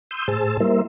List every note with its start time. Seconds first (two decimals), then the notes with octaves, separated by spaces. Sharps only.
0.11 C6 D#6 E6 G6
0.28 A2 G#4 C5 A5 E6
0.60 G3 A#3 E4 A#4 C5 E5